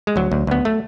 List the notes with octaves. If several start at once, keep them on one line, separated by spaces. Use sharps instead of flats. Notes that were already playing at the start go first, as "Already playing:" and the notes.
G#3
D2 F#3
D2
D2 B3
A3